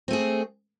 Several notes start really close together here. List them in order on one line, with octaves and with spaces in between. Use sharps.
C4 A3 G#4